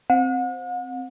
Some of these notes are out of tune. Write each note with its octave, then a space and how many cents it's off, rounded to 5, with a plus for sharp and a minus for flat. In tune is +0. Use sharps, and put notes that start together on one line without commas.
C4 +0 F#5 -40